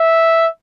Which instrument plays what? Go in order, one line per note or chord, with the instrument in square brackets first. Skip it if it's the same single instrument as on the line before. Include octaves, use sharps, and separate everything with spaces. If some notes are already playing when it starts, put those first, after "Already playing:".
Already playing: [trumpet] E5